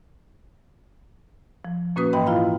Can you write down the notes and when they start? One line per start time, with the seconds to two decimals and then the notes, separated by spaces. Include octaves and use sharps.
1.65 F3
1.96 A#2 A#3 C#4 F#4 B4 D#6
2.13 G#2 E3 D#5 G5 B5
2.26 E4 F4 F5 A#5